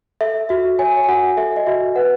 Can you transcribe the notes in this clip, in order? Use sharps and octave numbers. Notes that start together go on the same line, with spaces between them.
A4 E5
F#4 E5
C#5 G#5
G#5
F#4 F#5
A4 E5
D#5
F#4 E5
B4 F#5